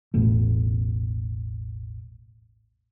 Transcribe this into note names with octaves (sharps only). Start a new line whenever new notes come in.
E1 A1 B2 A3